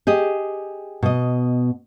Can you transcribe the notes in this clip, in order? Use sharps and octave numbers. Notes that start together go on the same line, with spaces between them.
G4 G#4 D#5
B2 D#5